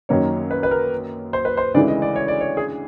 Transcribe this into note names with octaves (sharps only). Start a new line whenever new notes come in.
F#2 D#3 F#3 A#3 C#5
B4
B4
A#4
C5
B4
C5
D2 C#3 E3 G#3 D5
D#5
D5
C#5
D5
C#5
G#4